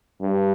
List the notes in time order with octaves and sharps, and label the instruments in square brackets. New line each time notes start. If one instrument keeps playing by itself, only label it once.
[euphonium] G2